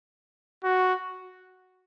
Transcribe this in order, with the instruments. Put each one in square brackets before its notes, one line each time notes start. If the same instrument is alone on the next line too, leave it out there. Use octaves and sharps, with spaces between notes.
[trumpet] F#4